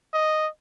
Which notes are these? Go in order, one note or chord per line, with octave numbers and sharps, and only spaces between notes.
D#5